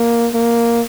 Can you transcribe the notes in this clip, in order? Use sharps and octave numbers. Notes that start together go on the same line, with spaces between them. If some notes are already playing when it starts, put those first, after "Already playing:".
Already playing: A#3
A#3